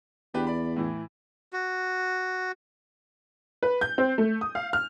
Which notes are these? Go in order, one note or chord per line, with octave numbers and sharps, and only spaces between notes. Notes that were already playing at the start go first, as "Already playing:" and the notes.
E2 D4 G4 B4
D5 B5
A2 E3
F#4
B4
G6
C4
A3
D#6
F5
F6